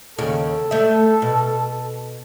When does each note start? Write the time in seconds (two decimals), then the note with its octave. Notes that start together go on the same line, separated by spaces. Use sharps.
0.18 D#2 C#3 A4
0.71 A3 E5
1.22 B2